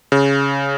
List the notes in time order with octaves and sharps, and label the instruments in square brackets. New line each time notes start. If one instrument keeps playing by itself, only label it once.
[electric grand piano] C#3